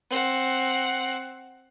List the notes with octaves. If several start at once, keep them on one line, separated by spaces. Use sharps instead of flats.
C4 F#5